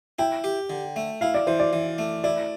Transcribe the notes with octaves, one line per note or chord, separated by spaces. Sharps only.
E4 G5
G4
D3
A3
E4 F5
D5
E3 C5
D5
E3
A3
E4 D5